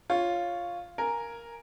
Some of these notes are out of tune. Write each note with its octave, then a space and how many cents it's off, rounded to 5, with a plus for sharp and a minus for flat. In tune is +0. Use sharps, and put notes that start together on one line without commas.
F4 +0 C#5 +0
A#4 +0 G#5 +0